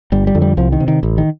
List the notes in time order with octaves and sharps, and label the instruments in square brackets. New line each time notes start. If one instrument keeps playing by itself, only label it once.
[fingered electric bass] G1 G3
G3
F2 D3
G3
C2 F3
D#3
C3
D#3
A1
D#3